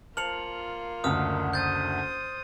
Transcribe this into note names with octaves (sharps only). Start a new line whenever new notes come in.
A#3 F4 C5 A5 F6 C#7 F7 F#7
F#1 D2 D3 D#6 F6
C5 D#6 G6 A6